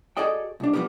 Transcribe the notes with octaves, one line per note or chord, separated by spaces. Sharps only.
F#4 G#4 A4 D5 D#5 G5
C2 D4
F3 G3 G#3 B3 G4 A#4